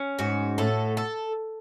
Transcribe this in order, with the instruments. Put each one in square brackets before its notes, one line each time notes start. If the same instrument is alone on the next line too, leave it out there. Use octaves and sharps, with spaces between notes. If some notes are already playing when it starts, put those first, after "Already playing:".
Already playing: [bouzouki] C#4
[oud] G#2 [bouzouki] F#4
[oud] A2 [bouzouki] A4
[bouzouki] A4